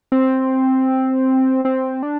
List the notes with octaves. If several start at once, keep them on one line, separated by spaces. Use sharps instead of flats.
C4
C4
D4